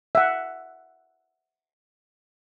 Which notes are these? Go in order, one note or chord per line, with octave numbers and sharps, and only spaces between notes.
E5 F#5